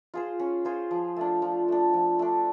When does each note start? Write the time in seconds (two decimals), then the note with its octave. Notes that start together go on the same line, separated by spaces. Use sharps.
0.14 F4 G#4 C5
0.40 C#4
0.65 F4 G#4 C5
0.91 F3
1.17 A3 D4
1.42 F3
1.68 A3 D4
1.93 F3
2.19 A3 D4